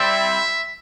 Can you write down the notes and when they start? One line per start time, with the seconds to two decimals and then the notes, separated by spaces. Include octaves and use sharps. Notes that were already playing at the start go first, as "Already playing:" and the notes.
Already playing: G3 C4 E4 E5